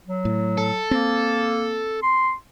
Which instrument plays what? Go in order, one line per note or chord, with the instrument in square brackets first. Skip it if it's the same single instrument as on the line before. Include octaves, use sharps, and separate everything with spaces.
[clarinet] F#3
[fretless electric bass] A2
[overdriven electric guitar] A4
[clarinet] A#3 [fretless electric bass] C4
[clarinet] C6